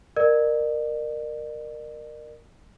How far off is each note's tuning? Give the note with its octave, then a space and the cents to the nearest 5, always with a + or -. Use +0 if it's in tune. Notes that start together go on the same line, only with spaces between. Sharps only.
A#4 +0 D5 +45